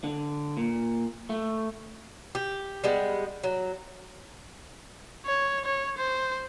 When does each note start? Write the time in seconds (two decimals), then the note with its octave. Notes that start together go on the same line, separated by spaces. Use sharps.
0.04 D3
0.57 A#2
1.30 A3
2.35 G4
2.84 G3 G#3 B3
3.43 F#3
5.26 C#5
5.65 C#5
5.98 C5